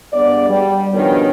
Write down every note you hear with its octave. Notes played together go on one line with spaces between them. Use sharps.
G2 G#3 B3 D5
G3
B2 D#3 F3 G3 C#4 D4